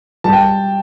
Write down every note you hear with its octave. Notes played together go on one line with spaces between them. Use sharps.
G3 A5
G5